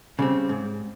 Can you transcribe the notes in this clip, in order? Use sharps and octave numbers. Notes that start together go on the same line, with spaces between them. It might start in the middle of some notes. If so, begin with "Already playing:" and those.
C#3 G3 C4
G#2